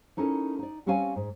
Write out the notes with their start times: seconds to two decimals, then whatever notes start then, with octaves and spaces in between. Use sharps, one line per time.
0.17 C#4 D#4 E4 A4 A#4
0.59 D#4 D5
0.86 G3 C4 C#4 C#5 F5 G#5
1.16 G#2